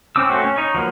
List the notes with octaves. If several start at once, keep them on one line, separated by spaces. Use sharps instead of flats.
C4 C#4 D6 E6
A3 C4 C#4 F#4
C#4
D#4 C#5
F3 F#3 A#3 B3